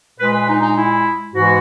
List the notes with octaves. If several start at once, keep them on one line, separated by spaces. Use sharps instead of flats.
A#2 G#3 B4
B4
D#4
D#4
E4
G#2 E3 G#3 F#4